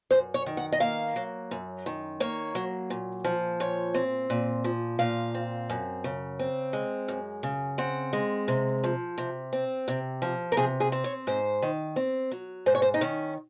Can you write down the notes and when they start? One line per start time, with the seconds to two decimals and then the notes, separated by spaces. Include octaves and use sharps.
0.11 F#2 C5
0.34 C#5
0.46 D#3
0.57 F#5
0.72 D#5
0.80 A#3 F5
1.16 F#3
1.51 F#2
1.86 D#3
2.20 A#3 C#5
2.55 F#3
2.90 A#2
3.24 F3
3.60 A#2 C#5
3.94 C4
4.30 A#2
4.64 F3
4.99 A#2 F5
5.34 C4
5.70 F#2
6.04 C#3
6.39 C4
6.73 G#3
7.08 F#2
7.43 C#3
7.78 C4 F#5
8.13 G#3
8.48 C3
8.84 F3
9.18 C3
9.53 C4
9.88 C3
10.22 F3
10.52 A#4
10.57 C3 G#4
10.80 G#4
10.92 C4
11.04 C#5
11.27 G#2 C5
11.62 D#3
11.96 C4
12.32 F#3
12.66 G#2 C5
12.75 C#5
12.82 C5
12.94 D#4
13.01 D#3 C#4